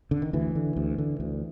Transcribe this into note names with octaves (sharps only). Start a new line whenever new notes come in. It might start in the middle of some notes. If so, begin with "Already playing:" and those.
D3
D#3
D2 E3
D3
D2
D3
D2